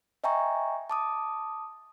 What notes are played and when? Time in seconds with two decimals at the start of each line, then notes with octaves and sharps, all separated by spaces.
0.24 D#5 E5 G5 G#5 A#5 C#6
0.90 A5 D6 D#6